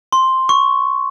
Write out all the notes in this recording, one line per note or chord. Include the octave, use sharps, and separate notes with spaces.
C6
C#6